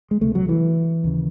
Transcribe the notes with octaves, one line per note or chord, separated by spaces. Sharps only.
G#3
C#2 C3 A3
F#3
E3
D#2 C#3